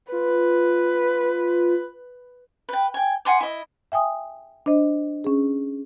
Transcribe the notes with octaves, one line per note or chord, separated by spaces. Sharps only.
F4 B4
B4 G5
G5 G#5
F#5 G#5 C6 D6
E4 D#5
E5 G5 G#5 D#6
D4 C5 D#5
C#4 G#4